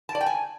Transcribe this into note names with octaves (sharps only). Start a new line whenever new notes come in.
A5
D5
G5
G#5